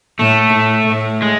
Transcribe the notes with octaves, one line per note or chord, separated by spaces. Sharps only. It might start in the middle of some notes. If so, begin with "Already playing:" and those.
A2 A3
A2
A2
G#3